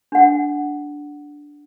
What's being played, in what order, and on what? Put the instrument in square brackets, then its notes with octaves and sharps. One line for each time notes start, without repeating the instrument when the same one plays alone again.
[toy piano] D4 F#5